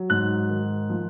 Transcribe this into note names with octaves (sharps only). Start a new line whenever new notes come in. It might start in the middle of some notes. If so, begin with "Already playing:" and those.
Already playing: F#3
G#2 F#6
D#3
F3